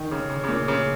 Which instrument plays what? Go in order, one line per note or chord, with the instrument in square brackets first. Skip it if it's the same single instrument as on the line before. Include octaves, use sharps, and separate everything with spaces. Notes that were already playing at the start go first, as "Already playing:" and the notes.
Already playing: [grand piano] D#3
C#3
C#3
C#3
A#2
C#3